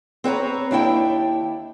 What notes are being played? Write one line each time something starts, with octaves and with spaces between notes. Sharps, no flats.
C4 B4 C#5 A#5
D#2 D4 E4 G5